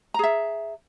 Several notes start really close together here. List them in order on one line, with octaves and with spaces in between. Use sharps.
A#5 G#4 E5